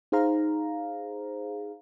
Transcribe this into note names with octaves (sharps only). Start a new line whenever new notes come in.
D#4 G#4 C5 F5 A#5